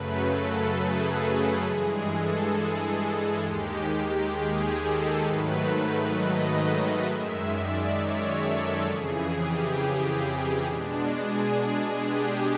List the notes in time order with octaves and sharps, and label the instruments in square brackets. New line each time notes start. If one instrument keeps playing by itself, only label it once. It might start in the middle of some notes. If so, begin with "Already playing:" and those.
Already playing: [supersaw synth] F#2 C#3 F#3 A3 B4
A4
G#4
G2 E3 G#3
A4
G#4
D#2 D#3 G#3 G4
G4
G#4
A4
G#2 D#3 F#3 A3 B4
D#5
F#2 D#3 G#3 E5
D5
C#5
A4
F2 C#3 E3 G#4
G4
G4
B2 G#3 D4
G#4
G#4
G4